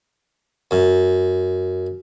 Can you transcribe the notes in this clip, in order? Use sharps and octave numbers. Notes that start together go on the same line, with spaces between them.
F#2